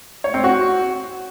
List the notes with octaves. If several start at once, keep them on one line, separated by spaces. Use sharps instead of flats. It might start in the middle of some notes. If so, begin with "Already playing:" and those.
C#5
C4
F#4